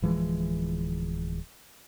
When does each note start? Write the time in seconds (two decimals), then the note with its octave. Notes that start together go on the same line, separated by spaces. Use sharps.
0.02 D1 E3 F3 G#3